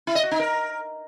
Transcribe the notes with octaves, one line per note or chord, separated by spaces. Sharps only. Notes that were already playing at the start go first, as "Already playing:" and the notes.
E4
D#5
F#4
D#4
A#4